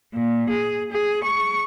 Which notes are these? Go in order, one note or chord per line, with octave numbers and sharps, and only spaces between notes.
A#2
G#4
G#4
C#6